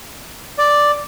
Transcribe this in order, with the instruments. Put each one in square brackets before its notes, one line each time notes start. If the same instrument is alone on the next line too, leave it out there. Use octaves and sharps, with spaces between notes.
[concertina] D5